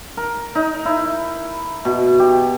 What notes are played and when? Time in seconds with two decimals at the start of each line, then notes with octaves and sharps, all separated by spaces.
0.17 A#4
0.55 D#4
0.85 E4
1.85 B2
2.19 G4